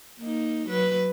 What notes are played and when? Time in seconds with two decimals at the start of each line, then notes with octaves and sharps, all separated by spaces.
0.20 A#3 D#4
0.67 F#3 B4